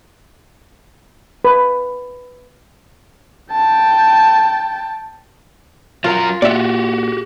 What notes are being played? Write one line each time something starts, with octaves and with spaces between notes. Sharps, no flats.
B4
G5 A5
F#3 F4 A#4 A#5
A#2 F#4 G4 D5 E5